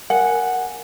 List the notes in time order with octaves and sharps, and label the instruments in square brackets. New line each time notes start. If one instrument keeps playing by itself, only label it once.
[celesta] A#4 G#5 [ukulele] F#5